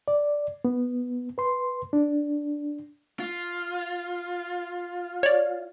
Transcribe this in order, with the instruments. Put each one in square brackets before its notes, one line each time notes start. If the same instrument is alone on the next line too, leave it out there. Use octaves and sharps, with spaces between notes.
[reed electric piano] D5
B3
B4 C6
D4
[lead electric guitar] F4
[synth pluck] C#5 D5